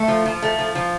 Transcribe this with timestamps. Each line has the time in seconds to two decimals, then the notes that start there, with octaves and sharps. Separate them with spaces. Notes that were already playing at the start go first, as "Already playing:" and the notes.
Already playing: A3
0.08 F3
0.25 F3
0.42 A3
0.59 F3
0.75 F3